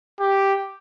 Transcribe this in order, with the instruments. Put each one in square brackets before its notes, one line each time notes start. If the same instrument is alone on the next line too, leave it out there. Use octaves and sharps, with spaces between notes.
[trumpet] G4